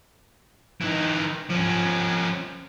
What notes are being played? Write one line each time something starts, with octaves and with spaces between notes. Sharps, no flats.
E3 D#4
F3 C#4